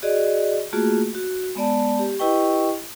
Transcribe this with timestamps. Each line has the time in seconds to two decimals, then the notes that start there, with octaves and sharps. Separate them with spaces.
0.02 F#4 G#4 D5 D#5
0.73 A3 A#3 F4 F#4 G#4
1.15 F#4
1.55 G#3 B3 D5 A5
1.99 G4
2.19 E4 G4 B4 D#5 G5 C#6